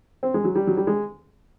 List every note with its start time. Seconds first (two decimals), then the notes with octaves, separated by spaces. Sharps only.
0.23 C4
0.34 G#3
0.44 F#3
0.56 G3
0.67 F#3
0.77 G3
0.87 G#3